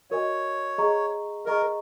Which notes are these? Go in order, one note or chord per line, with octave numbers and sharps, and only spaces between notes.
F#4 A#4 C#5 D#5 G#5
G#4 D#5 A#5 C#6
G#4 A#4 D#5 A#5 C#6